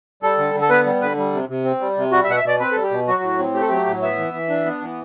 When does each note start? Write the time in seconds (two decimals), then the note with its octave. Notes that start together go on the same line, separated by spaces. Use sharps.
0.23 G3 A4
0.38 D3
0.55 D3
0.62 A4
0.70 B3 B4
0.86 G3
1.02 D3 B4
1.17 G3
1.33 C3
1.49 C3
1.65 C4
1.81 G3
1.97 C3
2.12 G3 F#4
2.24 E5
2.28 B2 F#5
2.36 E5
2.44 B2 D5
2.60 C4 B4
2.72 G3 A4
2.83 G4
2.91 B2
3.07 F#3 F#4
3.23 A2
3.39 C4
3.54 A3 G4
3.62 A4
3.69 F#3 G4
3.86 A2
4.02 B3 E5
4.18 E3
4.34 E3
4.49 D4
4.65 B3
4.81 E3